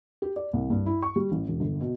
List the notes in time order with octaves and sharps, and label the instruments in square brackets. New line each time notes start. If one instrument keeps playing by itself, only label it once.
[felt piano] G4
D5
C2
G2
E4
C#6
G3
A1
E1
G1
B2